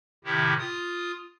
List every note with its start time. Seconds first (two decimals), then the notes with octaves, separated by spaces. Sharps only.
0.24 A2 C3 D#3 E4 G4
0.59 F4 D#6